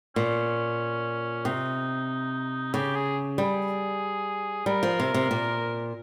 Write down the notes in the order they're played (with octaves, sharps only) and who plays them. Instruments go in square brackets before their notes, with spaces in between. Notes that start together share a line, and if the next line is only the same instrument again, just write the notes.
[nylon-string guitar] A#2 [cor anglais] C#4
[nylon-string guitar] C3 [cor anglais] D#4
[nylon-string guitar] C#3 [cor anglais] G4
[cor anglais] G#4
[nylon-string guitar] G3 [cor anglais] G#4
[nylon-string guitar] G3 [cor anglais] A#4
[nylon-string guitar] F3
C3
C3
A#2